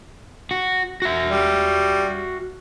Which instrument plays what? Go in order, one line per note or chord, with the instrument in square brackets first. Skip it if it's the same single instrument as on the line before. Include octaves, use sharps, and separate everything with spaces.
[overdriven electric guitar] F#4
F#4 E5
[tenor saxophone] G3